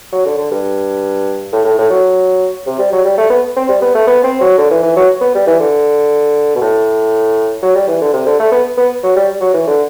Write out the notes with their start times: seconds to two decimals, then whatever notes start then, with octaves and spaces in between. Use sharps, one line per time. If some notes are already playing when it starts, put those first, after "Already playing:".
0.13 F#3
0.26 D3
0.37 D3
0.51 G2
1.53 A2
1.65 A2
1.79 A2
1.90 F#3
2.66 C3
2.79 G3
2.93 F#3
3.05 G3
3.18 A3
3.30 B3
3.57 C4
3.69 G3
3.82 B3
3.95 A3
4.07 B3
4.24 C4
4.40 F#3
4.58 D3
4.71 E3
4.83 E3
4.96 F#3
5.21 B3
5.35 G3
5.47 E3
5.60 D3
6.55 B2
6.61 A2
7.63 F#3
7.75 G3
7.88 E3
8.02 D3
8.13 C3
8.26 D3
8.39 A3
8.52 B3
8.77 B3
9.04 F#3
9.16 G3
9.41 F#3
9.54 E3
9.67 D3